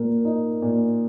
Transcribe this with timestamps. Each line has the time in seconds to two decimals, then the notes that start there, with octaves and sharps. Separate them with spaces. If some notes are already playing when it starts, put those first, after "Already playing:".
Already playing: A#2 A#3
0.25 D#4
0.62 A#2